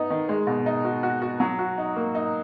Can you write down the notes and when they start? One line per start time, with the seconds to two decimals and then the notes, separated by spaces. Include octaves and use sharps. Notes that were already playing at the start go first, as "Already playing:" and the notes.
Already playing: B3 D#4
0.10 D#3
0.29 G#3
0.47 B2
0.66 D#4
0.85 F#4
1.03 F#4
1.22 F#4
1.40 F#3
1.59 F#4
1.78 D#4
1.96 A#3
2.15 D#4